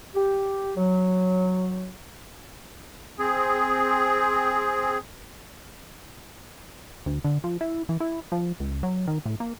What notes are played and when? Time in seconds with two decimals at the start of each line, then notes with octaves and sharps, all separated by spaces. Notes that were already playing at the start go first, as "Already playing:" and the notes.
0.15 G4
0.77 F#3
3.19 C4 G#4
7.06 D2
7.24 D3
7.44 F3
7.61 E4
7.89 E3
8.00 E4
8.32 F3
8.60 C#2
8.83 F#3
9.07 D#3
9.26 A2
9.40 A#3